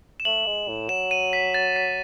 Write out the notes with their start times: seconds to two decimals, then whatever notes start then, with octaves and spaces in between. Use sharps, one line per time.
0.20 E7
0.25 A3 F#7
0.47 G#3
0.68 A2
0.89 F#3 E7
1.11 D#7
1.33 B6
1.54 A6
1.76 B6